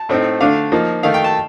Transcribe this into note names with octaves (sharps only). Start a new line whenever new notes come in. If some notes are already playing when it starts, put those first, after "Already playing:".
Already playing: A5
A2 A3 C4 D#4
D3 A3 D4 F5
F3 A#3 D#4
D#3 A3 D#4 F5
G5
A5